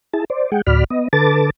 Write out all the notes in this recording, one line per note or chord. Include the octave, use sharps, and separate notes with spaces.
E4 G#4 A5
C5 D5
G#3 G#4 F#5 G5
D2 A2 F#4 D5 B5 F6
B3 D#5
D3 A4 B4 A5 D6 A6